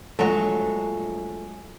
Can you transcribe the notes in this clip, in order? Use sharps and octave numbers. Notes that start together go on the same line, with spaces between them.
A#1 F#3 G#3 A3 F#4 A4